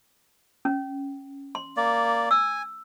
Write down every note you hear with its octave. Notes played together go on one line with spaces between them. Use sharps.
C#4
C6
A#3 D5
G#5 E6